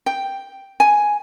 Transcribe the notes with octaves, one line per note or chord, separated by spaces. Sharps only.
G5
G#5